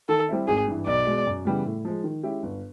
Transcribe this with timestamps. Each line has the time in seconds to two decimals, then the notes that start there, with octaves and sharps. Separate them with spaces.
0.09 D#3 A4
0.29 G3 C4 E4
0.48 G#1 G#4
0.67 G2 E3
0.87 B1 D5
1.06 B2 G#3
1.26 F#2
1.45 C#3 E3 G3 B3
1.65 A2
1.85 F3 G#3
2.04 D#3
2.23 G#3 C#4 E4 G4
2.43 G1